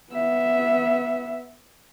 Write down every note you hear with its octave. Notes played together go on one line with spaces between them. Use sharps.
B3 E5